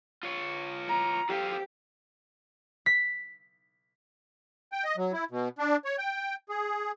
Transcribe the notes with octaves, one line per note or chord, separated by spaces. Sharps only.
F4 C#5
A#5
G4 A4 C5 F5
B6
G5
D#5
F#3
E4
B2
D4
C#5
G5
G#4